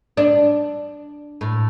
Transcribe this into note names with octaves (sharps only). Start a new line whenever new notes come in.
D4
A2